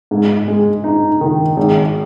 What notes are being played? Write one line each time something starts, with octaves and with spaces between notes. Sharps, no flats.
G#2
G#3
D#4
D#3
G#1